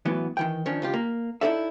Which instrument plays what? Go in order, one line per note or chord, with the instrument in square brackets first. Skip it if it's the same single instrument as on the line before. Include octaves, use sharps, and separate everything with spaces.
[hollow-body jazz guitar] A2 E3 F#3 B3
D#3 E3 G5
D#3 F3 C#4 D4
C#2 F4 G4
A#3
D#4 E4 G4 A4 D5 E5